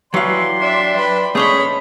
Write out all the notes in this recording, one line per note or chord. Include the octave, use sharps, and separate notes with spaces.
E3 F#3 G4 D5 F5 C6
D4 E5
B4 B5
A3 C#4 G#4 C#5 D#5 B5